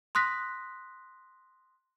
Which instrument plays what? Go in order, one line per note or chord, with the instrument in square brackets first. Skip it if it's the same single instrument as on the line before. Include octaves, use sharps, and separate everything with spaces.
[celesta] C6 D#6 F#6 A#6 B6